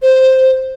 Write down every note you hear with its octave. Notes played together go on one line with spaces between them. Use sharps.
C5